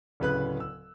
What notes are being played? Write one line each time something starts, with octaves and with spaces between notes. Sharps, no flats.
D1 C#3 B4 F#6
E6